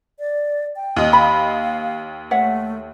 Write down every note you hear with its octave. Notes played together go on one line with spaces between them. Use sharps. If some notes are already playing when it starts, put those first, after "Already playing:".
D5
G5
D#2 D#5
F5 B5
A3 C#5 E5 F#5